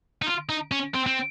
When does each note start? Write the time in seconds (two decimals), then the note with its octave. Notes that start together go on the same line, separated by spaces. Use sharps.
0.22 D#4
0.27 F4
0.49 D#4
0.72 C#4
0.94 C4
1.07 C4